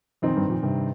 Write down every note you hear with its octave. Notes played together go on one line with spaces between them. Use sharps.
F2 A#2 D#3 C4 D#4
G2
F2 A#2
G2 C3